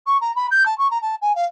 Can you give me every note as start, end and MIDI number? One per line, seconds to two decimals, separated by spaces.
0.06 0.17 85
0.21 0.34 82
0.35 0.47 83
0.51 0.63 91
0.66 0.76 81
0.78 0.90 85
0.90 1.00 82
1.02 1.15 81
1.22 1.35 80
1.35 1.44 77